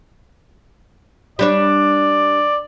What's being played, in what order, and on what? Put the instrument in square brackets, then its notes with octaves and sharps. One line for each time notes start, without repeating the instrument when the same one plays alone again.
[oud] G3 D4 C#5 [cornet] D5